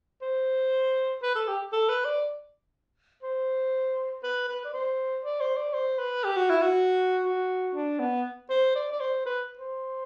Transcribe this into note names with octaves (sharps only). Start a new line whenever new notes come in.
C5
B4
A4
G4
A4
B4
D5
C5
B4
B4
D5
C5
D5
C5
D5
C5
B4
G4
F#4
E4
F#4
F#4
D4
B3
C5
D5
D5
C5
B4
C5